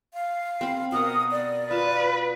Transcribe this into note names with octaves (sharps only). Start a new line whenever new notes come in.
F5
C4 B5
B2 A#4 F#5 D#6
D5
F4 B4 A5